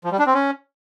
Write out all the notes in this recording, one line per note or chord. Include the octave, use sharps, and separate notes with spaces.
F3
G3
D4
C4
C#4